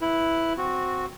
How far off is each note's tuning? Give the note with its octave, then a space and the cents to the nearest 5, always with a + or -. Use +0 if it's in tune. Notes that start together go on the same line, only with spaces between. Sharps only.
E4 +0 B4 +0
C4 +0 F#4 -10